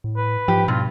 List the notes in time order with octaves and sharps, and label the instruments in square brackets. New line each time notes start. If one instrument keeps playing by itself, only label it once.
[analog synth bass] A2
[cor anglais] B4
[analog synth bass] G#2 [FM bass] F3 [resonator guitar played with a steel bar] G4
[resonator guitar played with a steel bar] G2 [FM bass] B2 [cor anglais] F4